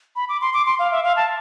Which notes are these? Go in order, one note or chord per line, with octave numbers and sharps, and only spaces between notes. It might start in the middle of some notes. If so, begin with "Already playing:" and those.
B5
D6
C6
D6
C6
F5
E5
F5
A5